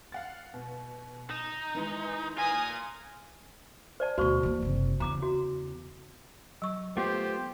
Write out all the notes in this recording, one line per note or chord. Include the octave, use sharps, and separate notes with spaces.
F5 F#5 A6
B2
D#4 E7
D#3 E3 G#3
F4 A#4 G#5 D#6
C5 D5 A5
D2 B2 F#4 C5 C#6
E3 A#3
F#1 C3
E2 C#3 A#5 D6
F#4
F#3 C#6
A3 B3 F4 G4 C5